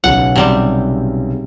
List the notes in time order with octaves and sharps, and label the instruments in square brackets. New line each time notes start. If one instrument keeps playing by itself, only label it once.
[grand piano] B1 C#3 [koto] F#5
[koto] C3 G3